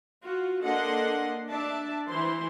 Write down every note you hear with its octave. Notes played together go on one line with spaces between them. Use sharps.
F4 F#4
A#3 D4 A4 D#5 F#5 C6
D4 D5 E5 A5
E3 E4 C5 C6